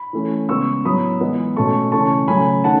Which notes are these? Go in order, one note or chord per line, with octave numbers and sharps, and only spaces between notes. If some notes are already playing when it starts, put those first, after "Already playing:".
Already playing: B5
E3 A3 C#4
C#3 G#3 B3 C#6 E6
A2 F#3 B3 B5 D#6
E3 G#3 B3
B2 A3 C#4 A5 C#6
C#3 E3 A3 C#4 A5 C#6
C#3 F#3 A3 C#4 G#5 B5
D#3 A3 C#4 F#5 A5